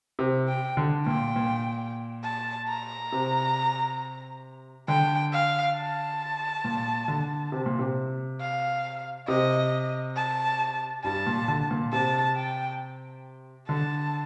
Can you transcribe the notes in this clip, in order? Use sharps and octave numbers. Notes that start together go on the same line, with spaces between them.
C3
G5
D3
A#2 G5
A#2
A5
A#5
C3
D3 G5
F5
A5
A#2
D3
C3
A#2
C3
F5
C3 D#5
A5
G2 A5
A#2
D3
A#2
C3 A5
G5
D3 A5